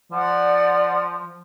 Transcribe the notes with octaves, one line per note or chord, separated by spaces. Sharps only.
F3 D5 F#5